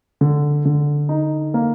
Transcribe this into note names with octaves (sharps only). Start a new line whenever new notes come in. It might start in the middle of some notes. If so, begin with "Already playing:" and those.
D3
D3
D#4
A#3